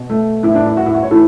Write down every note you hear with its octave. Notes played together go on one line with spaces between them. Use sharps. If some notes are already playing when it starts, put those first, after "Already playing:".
Already playing: B2
A3
A2 E3 E4
D4
E4
F#4
E4
F#4
C#5
A2 E3 A4